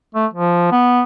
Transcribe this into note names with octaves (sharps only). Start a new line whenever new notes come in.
A3
F3
B3